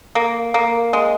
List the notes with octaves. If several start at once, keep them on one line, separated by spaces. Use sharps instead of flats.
A#3
A#3
G#3